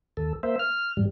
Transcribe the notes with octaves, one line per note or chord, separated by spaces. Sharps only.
D#2 A4
A#3 C5 E5
F6
F2 G#2 G3